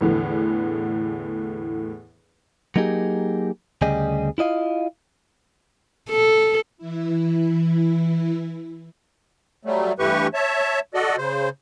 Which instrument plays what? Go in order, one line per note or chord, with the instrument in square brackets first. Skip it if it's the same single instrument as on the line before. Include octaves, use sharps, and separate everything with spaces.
[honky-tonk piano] E2 A2 D3 E3
[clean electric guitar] F#3 A#3 D#4 G4 G#4
D2 C#3 G3 G4 G#4 D#5
E4 F4 D#5 F5
[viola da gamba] A4
[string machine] E3 E4
[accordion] F#3 G3 A3
G2 E3 A3 G4 B4 C#6
C#5 E5 A5
F#4 A4 D5 D#5
C#3 C5